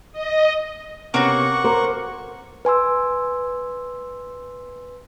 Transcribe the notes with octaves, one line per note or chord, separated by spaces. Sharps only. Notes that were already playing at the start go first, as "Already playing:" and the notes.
D#5
C3 A#3 B3 C#4 F#4 F#5 C#6
A#4 C5 D6
B4 G#5 C6 E6